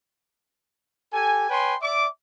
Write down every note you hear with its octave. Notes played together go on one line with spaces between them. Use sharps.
G4 A4 G#5
B4 C#5 G5 G#5 C6
D5 E5 D6